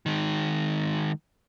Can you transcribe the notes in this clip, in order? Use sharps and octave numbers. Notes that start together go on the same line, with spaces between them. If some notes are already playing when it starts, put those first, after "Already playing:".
D#3 G#3